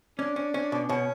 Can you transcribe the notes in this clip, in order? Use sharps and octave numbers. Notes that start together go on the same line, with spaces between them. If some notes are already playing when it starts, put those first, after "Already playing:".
C#4 D4
C#4
C#4
B2
B2 C#4